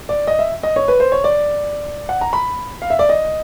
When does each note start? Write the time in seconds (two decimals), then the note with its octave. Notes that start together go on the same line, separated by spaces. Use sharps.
0.09 D5
0.27 D#5
0.39 E5
0.63 D#5
0.76 C#5
0.88 B4
1.00 C5
1.12 C#5
1.24 D5
2.09 F#5
2.21 A#5
2.33 B5
2.82 F5
2.90 E5
2.99 D5
3.09 D#5